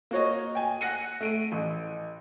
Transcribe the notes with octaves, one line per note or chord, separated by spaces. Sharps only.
A#3 F#4 C#5 D#5
G5 G#5
F#5 F#6 A#6 C#7 D#7
A3 D7 D#7
A1